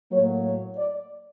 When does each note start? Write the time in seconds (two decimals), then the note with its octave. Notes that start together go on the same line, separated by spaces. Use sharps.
0.12 A2 F#3 A#3 C#5
0.44 C#5
0.77 D5